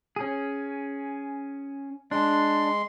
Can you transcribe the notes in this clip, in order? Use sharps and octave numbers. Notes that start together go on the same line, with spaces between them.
C#4 G#4
G#3 D4 C6